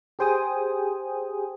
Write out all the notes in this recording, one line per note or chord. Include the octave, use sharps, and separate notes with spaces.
G4 G#4 C5 G5 G#5 D#6